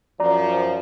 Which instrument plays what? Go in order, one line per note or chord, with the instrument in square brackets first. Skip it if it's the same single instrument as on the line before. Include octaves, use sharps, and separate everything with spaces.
[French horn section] F#2 F3 [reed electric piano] D5 A#5